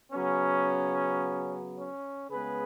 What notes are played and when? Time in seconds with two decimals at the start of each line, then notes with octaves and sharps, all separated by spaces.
0.12 C#3 F#3 B3 C#4
1.76 C#4
2.31 C#3 G#3 B3 G#4 B4